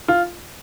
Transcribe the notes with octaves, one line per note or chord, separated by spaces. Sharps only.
F4